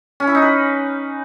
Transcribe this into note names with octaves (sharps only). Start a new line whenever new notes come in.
C#4
E4
D#4
B4